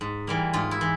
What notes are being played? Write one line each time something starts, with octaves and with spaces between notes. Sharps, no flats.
G#2
E3 G3 A#3
G#2 F4
E4
E3